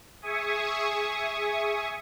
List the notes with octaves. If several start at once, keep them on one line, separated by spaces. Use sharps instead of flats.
G#4 E5 G#5 C#6 D#6